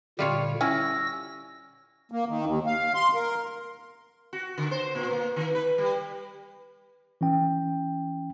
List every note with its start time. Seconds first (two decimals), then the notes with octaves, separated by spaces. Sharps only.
0.19 A#2 D3 G3 F4 C#5
0.61 C#4 E4 G#5 E6 A#6
2.12 A#3
2.29 D#3
2.45 D#2
2.67 F5
2.95 C6
3.14 A#4
4.33 F#4
4.58 D3
4.71 C5
4.95 A#2
5.11 A#3
5.36 D#3
5.55 B4
5.78 G3
7.21 E3 C#4 G5